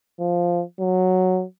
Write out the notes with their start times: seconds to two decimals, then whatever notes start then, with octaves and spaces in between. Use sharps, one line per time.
0.20 F3
0.80 F#3